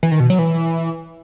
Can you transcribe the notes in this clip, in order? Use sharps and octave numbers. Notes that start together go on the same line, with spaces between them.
E3
D#3
B2
F#3
E3